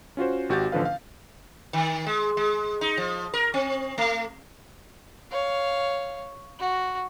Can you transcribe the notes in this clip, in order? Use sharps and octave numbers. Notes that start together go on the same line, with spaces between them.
C#4 F4 F#4 C5
G#1 F#4 G4 G6 A6
A1 D3 F3 B4 F5
F5
D#3
G#3
G#3
D#4
F3
A#4
C4
A3
C#5 F5
F#4